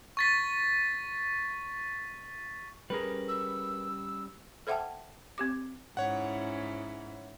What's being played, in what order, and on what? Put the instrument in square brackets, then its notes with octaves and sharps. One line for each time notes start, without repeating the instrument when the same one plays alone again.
[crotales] C#6 A6 B6
[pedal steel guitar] G3 C#4 A#5 [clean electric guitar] G#4 A#4 B4
[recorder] E6
[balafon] A4 C5 E5 F#5 G5 A5
C4 G4 D6
[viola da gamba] G#2 C#4 E4 [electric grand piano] C#5 F#5